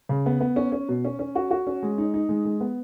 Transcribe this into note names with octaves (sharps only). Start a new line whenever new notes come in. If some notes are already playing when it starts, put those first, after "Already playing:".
C#3
B3
B3
C#4
C#4
B2
C#4
C#4
F#4
F#4
C#4
G#3
D#4
D#4
G#3
G#3
B3